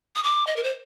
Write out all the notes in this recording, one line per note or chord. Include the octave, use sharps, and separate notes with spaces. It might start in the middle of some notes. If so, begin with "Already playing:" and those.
D#6
D6
D#5
A#4
C5